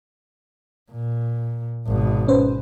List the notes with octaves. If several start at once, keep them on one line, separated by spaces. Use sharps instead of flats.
A#2
G#1 B2
C#4 B4 C5